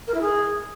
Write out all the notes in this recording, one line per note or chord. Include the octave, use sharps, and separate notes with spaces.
A#4
E4
G#4